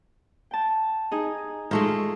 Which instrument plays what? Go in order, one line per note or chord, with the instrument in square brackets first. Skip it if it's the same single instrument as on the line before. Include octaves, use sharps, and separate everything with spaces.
[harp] G5 A5
D#4 G#4 G#5
[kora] G#3 A3 D#4 [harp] F4